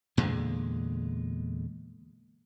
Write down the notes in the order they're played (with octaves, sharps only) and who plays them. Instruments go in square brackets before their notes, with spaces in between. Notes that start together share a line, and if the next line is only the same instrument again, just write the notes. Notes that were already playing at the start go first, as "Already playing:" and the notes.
[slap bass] E2 A#2 D3 G#3